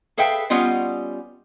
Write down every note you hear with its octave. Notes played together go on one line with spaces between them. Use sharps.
G#4 A4 B4 E5 F5 G5
G3 B3 C#4 F4 D#5